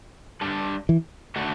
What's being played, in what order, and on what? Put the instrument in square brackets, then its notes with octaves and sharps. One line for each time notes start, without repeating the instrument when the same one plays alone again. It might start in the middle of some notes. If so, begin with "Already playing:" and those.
[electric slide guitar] G3 D4 A4
[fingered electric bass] E3
[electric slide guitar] D3 A3 D4 F#4 A4